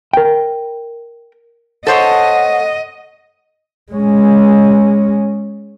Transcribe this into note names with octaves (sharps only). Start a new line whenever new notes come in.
A#4 G5
A4 C5 C#5 D#5 F#5
G#3 C#4